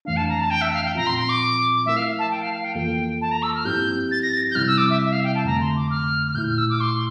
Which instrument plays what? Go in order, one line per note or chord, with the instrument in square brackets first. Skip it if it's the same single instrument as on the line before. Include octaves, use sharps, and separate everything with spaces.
[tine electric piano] F2 E3 A3 D4 [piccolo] F5
[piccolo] A5
A#5
A5
G5
E5
F5
G5
[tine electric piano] A#2 F3 C4 F4 [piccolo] A#5
[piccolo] C6
C6
D6
[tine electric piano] F3 A3 E4 A#4 [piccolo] E5
[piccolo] F5
A5
G5
F5
F5
G5
[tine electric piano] F2 E3 A#3 F4 A4 [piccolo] G5
[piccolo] A5
A#5
E6
F6
[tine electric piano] G2 F3 C4 E4 G4 [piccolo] G6
[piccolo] A6
A#6
A6
G6
[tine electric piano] C3 G3 C4 E4 [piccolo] F6
[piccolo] E6
D6
E5
E5
F5
G5
A5
[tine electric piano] F2 D3 A3 [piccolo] A#5
[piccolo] C6
D6
F6
F6
[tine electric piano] A#2 A3 E4 [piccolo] G6
[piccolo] F6
E6
D6
C6